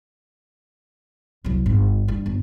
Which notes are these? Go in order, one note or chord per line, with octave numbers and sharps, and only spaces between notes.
C2 F#3
G1
G2
G1